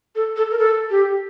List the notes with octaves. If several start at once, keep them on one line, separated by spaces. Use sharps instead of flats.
A4
A4
A#4
A4
G4